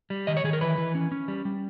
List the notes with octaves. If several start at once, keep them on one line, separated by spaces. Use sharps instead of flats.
G3
D#3 D#5
C#5
D#3 G#4
A#4
E3 B4
E3
C#4
C#4
G3
G3